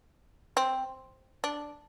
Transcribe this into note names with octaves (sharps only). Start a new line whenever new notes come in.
C4
D4